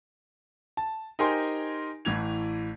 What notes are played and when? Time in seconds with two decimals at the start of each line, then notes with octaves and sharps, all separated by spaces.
0.77 A5
1.19 D#4 G4 A#4 C5 G#5 C6
2.05 A1 A2 E3 G#6 F7